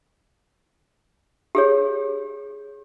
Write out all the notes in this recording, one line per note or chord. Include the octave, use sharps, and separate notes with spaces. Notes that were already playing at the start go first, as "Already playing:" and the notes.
G4 G#4 C#5